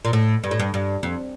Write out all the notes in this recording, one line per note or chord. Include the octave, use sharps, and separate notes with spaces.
A#2
A2
G2
A2
G2
G2
F2